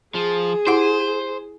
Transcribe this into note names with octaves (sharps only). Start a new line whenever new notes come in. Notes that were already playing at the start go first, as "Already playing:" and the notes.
F3 G#4
E4 G4 C5 F#5